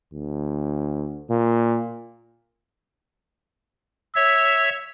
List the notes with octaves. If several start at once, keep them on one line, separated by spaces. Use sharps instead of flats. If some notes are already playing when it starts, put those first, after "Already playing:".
D2
A#2
C#5 E5 E6